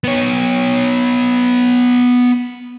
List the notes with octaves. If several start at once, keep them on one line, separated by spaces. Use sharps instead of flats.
B3 C#5